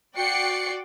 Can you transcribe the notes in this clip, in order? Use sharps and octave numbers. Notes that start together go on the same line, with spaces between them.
F#4 D5 G5 C7 C#7